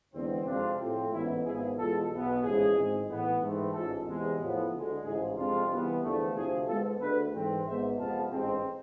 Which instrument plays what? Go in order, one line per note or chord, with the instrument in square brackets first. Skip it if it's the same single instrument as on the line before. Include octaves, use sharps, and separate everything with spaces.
[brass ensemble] E2 D3 G#3 C4
F2 C3 F3 G#3 C4 D4 F4
A2 F3 A3 C4
A1 G#2 E3 B3 E4
G#1 G#2 F3 B3 E4 G#4
E2 B2 G#3 F4 A4
B1 B2 B3
A1 G#2 F3 G#3 E4 G#4
G#1 G#2 G#3 C4
A2 E3 B3
G#2 E3 A3 C4
A1 G#2 G#3 F4 A4
E2 C3 G#3
A2 F3 B3
D2 D3 G#3
A1 G#2 F3 E4 G#4
F2 C3 G#3 C4 D4 F4
C2 C3 E3 B3
E2 D3 F3 A3
D2 C3 F3 E4 G#4
G#2 G#3 B3 F4 A4
D2 D3 A3 G#4 B4
G#2 E3 A3 C4
G#1 G#2 G#3 B3 C5 E5
F2 C3 F3 G#3 B3 F5 A5
A1 G#2 G#3 C4